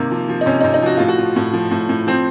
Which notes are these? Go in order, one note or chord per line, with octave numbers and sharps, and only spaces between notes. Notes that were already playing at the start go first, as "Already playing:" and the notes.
Already playing: C3 D#3 A#3
F3
F3
D#4
C3 C#4
C3 D#4
D#4
F3 F#4
A2 F4
F#4
F3
A2
F3
A2
A2
F3 C4